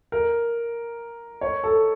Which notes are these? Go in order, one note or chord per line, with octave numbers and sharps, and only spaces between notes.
A#4
C#5
A4